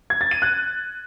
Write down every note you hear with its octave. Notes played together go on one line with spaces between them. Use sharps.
G#6
A6
D#7
F#6